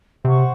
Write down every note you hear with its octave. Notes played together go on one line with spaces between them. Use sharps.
C3 C5 F#5 C#6